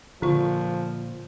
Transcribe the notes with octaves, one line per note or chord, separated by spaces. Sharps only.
A#2 D3 F3 F4 C#6